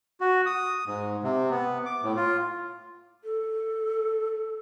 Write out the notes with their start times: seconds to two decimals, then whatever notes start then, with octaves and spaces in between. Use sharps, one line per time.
0.21 F#4
0.46 D#6
0.86 G#2
1.23 C3
1.51 B3
1.85 D6
2.03 A2
2.16 F4
3.24 A4